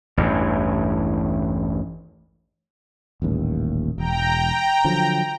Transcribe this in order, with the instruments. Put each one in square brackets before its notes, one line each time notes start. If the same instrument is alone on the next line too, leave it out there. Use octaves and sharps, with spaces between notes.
[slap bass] A1 E2 G2
[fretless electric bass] D#1 A1 D#2
[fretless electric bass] E1 [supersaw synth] G5 A#5
[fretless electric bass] D3 F3 F#3